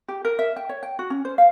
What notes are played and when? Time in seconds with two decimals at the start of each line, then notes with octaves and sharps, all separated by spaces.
0.08 G4
0.25 A#4
0.39 E5
0.56 G5
0.69 C#5
0.83 G5
0.99 F#4
1.10 C#4
1.25 C5
1.38 F5